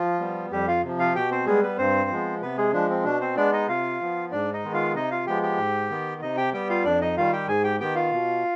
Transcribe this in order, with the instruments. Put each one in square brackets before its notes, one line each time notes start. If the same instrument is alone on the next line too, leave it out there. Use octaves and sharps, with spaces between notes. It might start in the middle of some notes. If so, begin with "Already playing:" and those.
Already playing: [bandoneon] F3 F4
G3 B3
F2 G3 G4
F4 F5
C3 F3
F4 F5
B2 G4 G5
C4 C5
G3 G#3 B3 G#4
B3 B4
G2 C4 C5
F3 G#3 B3
C3 B3 B4
G#3 G#4
F3 G#3 D4
C4
B2 D4
C4 C5
G#3 B3 D4 D5
D#4 D#5
C3 F4 F5
F3 B3
G#2 D4 D5
D#4 D#5
D#3 G#3 B3
F4 F5
C3 D#4 D#5
F4 F5
F3 G#3 B3 G4 G5
G4 G5
G#2
D#3 B3
C3 D#4 D#5
G4 G5
G3 B3 G4 G5
F4 F5
F2 D4 D5
D#4 D#5
D#3 G3 F4 F5
G4 G5
G#2 G#4 G#5
G4 G5
D#3 B3 G4 G5
F4 F5
B2